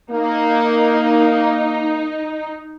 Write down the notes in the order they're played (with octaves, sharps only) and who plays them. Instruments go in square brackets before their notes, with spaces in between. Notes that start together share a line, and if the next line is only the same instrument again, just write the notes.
[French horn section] A#3 [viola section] D#4